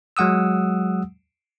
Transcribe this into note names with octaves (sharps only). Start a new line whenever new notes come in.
F#3 G#3 F#5 D#6 E6